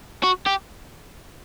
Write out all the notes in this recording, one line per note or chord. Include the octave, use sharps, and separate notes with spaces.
F#4
G4